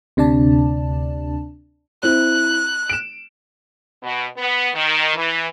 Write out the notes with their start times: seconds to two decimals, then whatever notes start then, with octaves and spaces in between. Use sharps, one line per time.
0.17 D2 C3 D4 D5 A5
2.03 C4 E4 F#6
2.90 D7 E7
4.03 B2
4.37 B3
4.74 D#3
5.15 E3